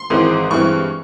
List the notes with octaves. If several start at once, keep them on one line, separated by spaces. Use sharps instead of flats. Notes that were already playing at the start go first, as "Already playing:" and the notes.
Already playing: C6
G#1 G#2 E3 G#3 C4
G2 E3 G#3 C4 C#6